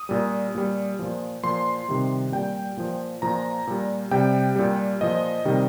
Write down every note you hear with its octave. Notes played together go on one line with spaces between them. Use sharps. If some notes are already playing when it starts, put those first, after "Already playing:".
Already playing: D#6
A#2 G3
A#2 G3
A#2 F3
A#2 F3 C6
C3 D#3 G3
A#2 G3 G5
A#2 F3
A#2 F3 A#5
A#2 G3
C3 G3 G5
A#2 G3
A#2 F3 D#5
C3 D#3 G3